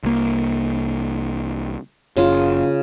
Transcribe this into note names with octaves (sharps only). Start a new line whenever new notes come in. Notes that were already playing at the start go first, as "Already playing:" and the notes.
C2 A#3
F#1 C#3 F4